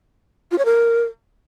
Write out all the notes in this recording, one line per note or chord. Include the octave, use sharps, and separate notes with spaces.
F4
C#5
A#4